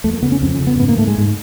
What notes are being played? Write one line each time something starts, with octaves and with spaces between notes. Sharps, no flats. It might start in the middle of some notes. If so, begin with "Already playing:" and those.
F2 A3
A#3
C#3 B3
C#4
F2 C4
C#4
C#3
B3
G#2 B3
A#3
G#2 A3
G#3
G#2